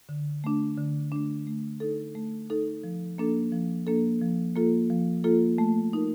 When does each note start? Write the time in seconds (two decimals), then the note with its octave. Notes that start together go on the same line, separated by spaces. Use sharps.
0.09 D3
0.44 A3 D4
0.77 D3
1.12 A3 D4
1.47 A3
1.80 D#4 A4
2.15 A3
2.50 D#4 A4
2.84 F3
3.18 A#3 D4 A4
3.52 F3
3.87 A#3 D4 A4
4.21 F3
4.55 A#3 F4 A4
4.90 F3
5.24 A#3 F4 A4
5.58 A3
5.93 D#4 A#4